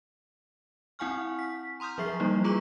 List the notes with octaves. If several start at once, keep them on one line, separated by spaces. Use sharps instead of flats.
C4 E4 F#5 G#5 C#6 F6
B6
A#5 C6 D#6 F6 G6
F3 F#3 G#4 E5 C#6 C7
F3 G3 A#3 D#4 E4
F4 G#4 B4 A#5 C#6 D6